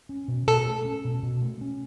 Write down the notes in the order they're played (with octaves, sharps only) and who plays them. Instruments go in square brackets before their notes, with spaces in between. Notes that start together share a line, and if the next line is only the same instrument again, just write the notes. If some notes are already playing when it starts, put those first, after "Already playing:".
[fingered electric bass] C#4
B2
[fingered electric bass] B2 [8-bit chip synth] A4
[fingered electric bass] A3
C#4
B2
B2
A3
C#4